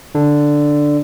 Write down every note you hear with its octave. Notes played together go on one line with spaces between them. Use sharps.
D3